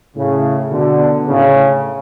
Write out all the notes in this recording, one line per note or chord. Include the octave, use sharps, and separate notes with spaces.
A2 C#3
B2 D3
A2 C#3